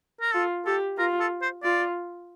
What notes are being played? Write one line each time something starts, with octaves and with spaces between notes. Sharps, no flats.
A#4
F4 A4
G4 A4
F4 A#4
A4
C5
F4 D5